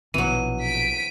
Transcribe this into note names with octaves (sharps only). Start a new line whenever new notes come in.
A#1 B2 E3 F#3 D#7
B6 D7